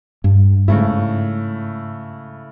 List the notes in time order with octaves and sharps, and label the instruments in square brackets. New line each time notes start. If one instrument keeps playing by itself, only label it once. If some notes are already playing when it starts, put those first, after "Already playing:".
[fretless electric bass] G2
[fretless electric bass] G#2 [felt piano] C#3 A3 E4